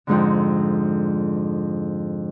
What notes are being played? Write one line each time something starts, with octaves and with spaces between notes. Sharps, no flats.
F2 G#2 D3